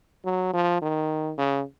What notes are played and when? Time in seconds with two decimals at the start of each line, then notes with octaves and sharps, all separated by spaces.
0.25 F#3
0.54 F3
0.82 D#3
1.38 C#3